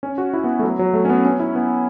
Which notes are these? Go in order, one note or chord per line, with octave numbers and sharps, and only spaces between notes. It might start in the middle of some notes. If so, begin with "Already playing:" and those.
C#4
F#4
E4
B3
A3
F#3
F#3
A3
C#4
B3
C#4
E4
B3